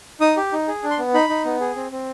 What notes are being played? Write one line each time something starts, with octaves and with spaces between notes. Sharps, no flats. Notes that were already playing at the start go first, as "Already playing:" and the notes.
D#4 D#6
G4
D#4
G#4
D4
C6
B3
D#4 B5
D#4
B3
G#4
C4
C4